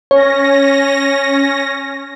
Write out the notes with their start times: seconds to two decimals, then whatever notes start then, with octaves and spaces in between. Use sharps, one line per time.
0.11 C#4 C#5 A#6